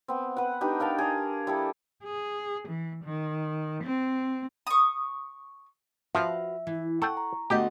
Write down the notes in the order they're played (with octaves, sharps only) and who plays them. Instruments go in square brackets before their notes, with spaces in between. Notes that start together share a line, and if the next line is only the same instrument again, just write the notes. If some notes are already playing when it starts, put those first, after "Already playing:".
[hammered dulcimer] B3 C4
B4 F#5
D4 D#4 G4 B4
A#4 F5 G5 A5
G#4 D5
G3 E4 A4
[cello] G#4
E3
D#3
C4
[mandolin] C#6 D#6
[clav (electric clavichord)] F3 [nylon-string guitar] F#4 B4 F5 [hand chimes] E5
[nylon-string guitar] E3
[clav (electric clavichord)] A4 G5 [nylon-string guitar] F#5 [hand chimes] C#6
[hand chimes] A#5
[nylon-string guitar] D3 A3 D#5 [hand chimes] B3 F#4 F#5 [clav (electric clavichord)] G4